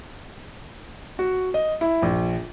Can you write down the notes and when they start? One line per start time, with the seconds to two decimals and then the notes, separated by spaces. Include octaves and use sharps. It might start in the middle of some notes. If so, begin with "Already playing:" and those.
1.19 F#4
1.54 D#5
1.81 E4
2.02 A#1